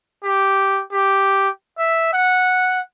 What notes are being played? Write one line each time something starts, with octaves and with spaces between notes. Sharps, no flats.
G4
G4
E5
F#5